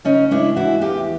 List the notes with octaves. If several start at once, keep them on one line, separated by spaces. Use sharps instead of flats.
C#3 C#4 D#4
G#3 D4 E4
E3 E4 F#4
E2 F4 G4